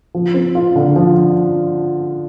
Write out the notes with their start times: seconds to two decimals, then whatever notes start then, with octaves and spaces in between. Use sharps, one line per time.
0.15 F3
0.34 C4
0.55 F4
0.76 D3
0.96 F3